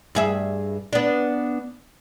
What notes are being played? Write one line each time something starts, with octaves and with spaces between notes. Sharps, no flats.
G2 G#4 E5
B3 D4